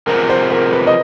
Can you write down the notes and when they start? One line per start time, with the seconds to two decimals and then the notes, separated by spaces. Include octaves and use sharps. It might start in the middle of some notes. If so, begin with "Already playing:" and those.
0.07 C3 F3 G#3 B3 A#4
0.29 C5
0.51 A#4
0.72 B4
0.87 D#5